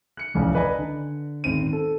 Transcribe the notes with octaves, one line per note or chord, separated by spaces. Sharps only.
F#6 C#7
D1 C2 F2 C#3 E3
B4 D5 D#5 G#5 A#5
D3
D#1 G#1 C4 D#7
A4